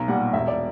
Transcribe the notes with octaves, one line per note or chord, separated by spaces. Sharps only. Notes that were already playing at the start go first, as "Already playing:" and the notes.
Already playing: B1 A#5
A#2 G3 F#5
E1 E5
D5